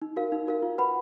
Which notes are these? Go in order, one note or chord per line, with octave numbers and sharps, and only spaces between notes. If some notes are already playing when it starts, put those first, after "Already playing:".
D#4
F#4 A#4 F5
D#4
F#4 A#4 F5
F4
B4 F#5 B5